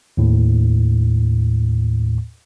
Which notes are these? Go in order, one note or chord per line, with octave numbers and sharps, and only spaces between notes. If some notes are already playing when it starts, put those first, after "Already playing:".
D#2 A2